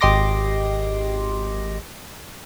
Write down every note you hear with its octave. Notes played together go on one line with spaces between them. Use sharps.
G#1 G4 D#5 C6 D6 A#6